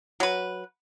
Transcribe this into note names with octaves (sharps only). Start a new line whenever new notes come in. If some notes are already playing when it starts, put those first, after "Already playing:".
F#3 B4